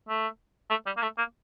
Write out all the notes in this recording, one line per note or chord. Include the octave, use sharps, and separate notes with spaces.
A3
A3
G3
A#3
A3
A#3